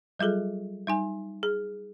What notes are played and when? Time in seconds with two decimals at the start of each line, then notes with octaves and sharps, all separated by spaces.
0.19 F#3 G3 F4 G#4 A4
0.87 G3 D#4 G#5
1.43 G#4